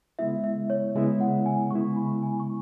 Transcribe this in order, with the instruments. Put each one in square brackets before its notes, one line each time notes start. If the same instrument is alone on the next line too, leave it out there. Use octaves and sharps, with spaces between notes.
[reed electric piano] C#3 G#3 B3 E4 [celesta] E5
[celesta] E5
C#5
[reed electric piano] C#3 G#3 B3 E4 [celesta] E5
[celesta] F#5
G#5
[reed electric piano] C#3 G#3 B3 E4 [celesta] C#6
[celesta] B5
G#5
C#6